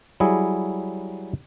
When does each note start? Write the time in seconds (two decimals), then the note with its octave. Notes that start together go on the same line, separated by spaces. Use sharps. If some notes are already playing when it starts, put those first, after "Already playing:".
0.20 F#3 G3 E4 G#4